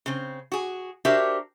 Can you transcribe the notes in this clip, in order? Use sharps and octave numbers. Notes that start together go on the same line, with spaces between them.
C#3 C4
F#4 G#4
D4 F#4 G4 A#4 C5 E5